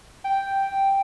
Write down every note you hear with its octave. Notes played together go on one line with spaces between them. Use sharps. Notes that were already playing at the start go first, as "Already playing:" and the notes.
G5